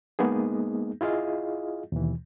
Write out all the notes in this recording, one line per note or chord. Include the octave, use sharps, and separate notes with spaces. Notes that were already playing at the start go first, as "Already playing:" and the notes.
G#3 A#3 B3 D#4 G#4
E4 F4 G#4 D#5 F5
D#2 B2 E3